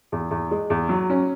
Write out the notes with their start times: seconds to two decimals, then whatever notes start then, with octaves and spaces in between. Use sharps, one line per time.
0.12 E2
0.31 E2
0.51 G#3
0.70 E2
0.89 F#3
1.10 C#4